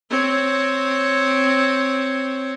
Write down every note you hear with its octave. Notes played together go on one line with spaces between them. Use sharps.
C4 C#5